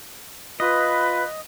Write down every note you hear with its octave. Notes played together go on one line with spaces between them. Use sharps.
F4 B4 D#5